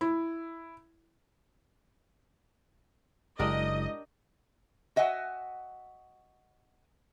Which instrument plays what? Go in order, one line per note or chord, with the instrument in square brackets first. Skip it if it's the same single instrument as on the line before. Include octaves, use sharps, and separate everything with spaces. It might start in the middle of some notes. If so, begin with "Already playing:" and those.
[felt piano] E4
[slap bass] F#1 [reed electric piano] G#3 E4 [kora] D4 G4 A#4 [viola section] D#5
[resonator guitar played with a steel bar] F#4 D#5 E5 F#5 G#5